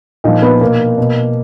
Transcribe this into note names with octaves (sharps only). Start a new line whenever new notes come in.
A#2 F3 D#4
B3
B2 A#3
B2